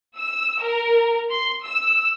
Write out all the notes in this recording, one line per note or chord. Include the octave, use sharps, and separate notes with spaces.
E6
A#4
C6
E6